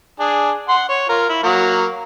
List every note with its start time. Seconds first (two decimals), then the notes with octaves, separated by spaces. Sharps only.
0.20 D4 G#4
0.68 F#5 C6
0.89 C#5
1.09 F4 A#4
1.29 E4
1.43 F#3 A#3 F#4